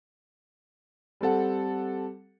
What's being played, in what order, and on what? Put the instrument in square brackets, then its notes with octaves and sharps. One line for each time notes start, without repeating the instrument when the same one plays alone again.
[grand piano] G3 C4 A4 F#5